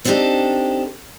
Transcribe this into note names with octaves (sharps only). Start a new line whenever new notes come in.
B3 C4 D4 D#4 G4 A4